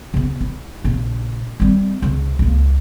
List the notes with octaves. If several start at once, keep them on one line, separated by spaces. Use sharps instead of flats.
C#3 B3
E4
A#1 C#3
G3 C4
C#2 C#3
C#2 A#3